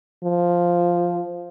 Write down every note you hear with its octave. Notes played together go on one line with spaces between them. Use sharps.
F3